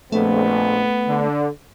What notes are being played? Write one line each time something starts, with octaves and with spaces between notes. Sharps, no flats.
A#1 F2 A3 B3
D3